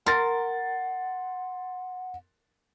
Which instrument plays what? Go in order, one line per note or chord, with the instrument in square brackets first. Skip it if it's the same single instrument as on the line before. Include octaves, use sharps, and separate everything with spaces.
[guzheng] A#4 [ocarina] F#5 [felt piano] C6 A6